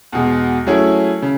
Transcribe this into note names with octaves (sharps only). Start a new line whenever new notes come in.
E2 B2 G#3
F#3 A3 C#4 E4 G#4
C#3